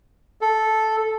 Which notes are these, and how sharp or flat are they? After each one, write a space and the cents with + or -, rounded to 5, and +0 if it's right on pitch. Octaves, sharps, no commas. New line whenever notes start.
A4 -5